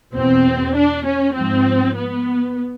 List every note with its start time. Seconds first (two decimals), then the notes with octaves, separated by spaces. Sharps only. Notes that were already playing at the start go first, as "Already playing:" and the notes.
0.15 E2 B2 C4
0.76 D4
1.05 C#4
1.35 G#2 F3 C4
1.95 B3